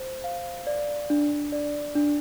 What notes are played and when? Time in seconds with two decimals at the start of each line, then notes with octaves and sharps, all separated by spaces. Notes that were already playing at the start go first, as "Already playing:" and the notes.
Already playing: C5
0.24 F5
0.67 D5
1.10 D4
1.52 D5
1.95 D4